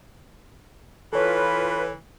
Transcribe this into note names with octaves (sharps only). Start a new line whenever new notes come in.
E3 F4 A4 B4 C#5